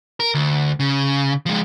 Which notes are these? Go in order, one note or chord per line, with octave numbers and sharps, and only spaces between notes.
A#4
D2
C#3
F3 G#3